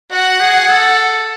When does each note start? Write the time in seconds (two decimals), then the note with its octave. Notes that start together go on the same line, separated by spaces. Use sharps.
0.12 F#4 F#5
0.40 G#4
0.68 A4